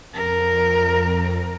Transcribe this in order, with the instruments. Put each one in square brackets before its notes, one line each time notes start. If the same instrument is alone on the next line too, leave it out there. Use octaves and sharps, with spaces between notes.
[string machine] F2 [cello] A#4